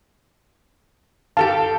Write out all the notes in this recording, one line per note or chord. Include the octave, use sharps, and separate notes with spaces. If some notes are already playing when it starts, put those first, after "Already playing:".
G4 A4 F5 A5